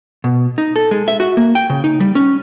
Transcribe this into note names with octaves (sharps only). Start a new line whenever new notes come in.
B2
D#4
A4
G#3
E5
F#4
A#3
G5
C#3
D#4
G3
C#4